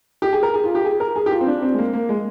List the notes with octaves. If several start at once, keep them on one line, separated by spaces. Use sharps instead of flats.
G4
G#4
A#4
G#4
F4
G4
G#4
A#4
G#4
G4
F4
C4
D4
C4
G#3
A#3
A#3
G#3